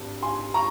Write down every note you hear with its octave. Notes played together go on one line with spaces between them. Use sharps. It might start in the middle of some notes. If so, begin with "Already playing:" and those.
Already playing: G#1 G2
G#5 C6
A#5 C#6